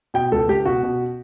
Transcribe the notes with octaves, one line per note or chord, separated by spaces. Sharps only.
B2 G5
C#2 A4
C#2 G4
B2 F#4
B2